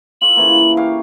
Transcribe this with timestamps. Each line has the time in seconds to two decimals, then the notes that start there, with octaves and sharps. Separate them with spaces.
0.22 F4 A4 C#5 F#7
0.37 C#3 E3 A#3
0.77 G4 C#5 F5